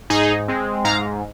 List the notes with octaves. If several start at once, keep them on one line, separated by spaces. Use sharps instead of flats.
G#2 D#4 G#4
G#3 C4
G#2 F5 A#5